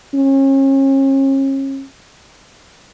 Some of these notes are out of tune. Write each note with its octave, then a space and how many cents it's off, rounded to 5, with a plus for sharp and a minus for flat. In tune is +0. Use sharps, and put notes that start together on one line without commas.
C#4 -35